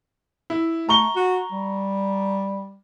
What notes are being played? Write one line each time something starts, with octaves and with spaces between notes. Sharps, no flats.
E4
A3 A#5 C#6 G7
F#4
G3